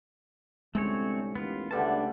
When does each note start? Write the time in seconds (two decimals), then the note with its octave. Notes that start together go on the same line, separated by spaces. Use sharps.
0.75 C2 D3 G#3 A3 C4 C#4 C#5
1.35 A1 D#2 B3 F4
1.71 C#2 D3 G3 A3 D4 A4 B4 A5